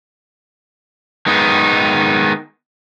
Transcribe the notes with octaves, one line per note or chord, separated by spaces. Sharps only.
D#3 G#3 B3 D#4